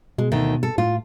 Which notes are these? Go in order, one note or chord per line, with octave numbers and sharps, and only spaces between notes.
B2 G#3
D2 D#3 A3
A4
A2 F4